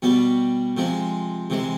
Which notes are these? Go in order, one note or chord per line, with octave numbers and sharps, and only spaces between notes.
B2 G3 B3
C3 F3 G#3
C3 E3 G#3